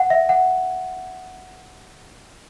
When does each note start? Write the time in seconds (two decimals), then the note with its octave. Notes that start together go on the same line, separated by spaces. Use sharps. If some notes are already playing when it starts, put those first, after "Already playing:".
Already playing: F#5
0.10 E5
0.29 F#5